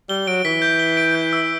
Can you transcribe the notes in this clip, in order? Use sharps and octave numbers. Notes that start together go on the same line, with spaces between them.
G3 G7
F#3 D7
E3 B6
G6
G7
D7
G6
E6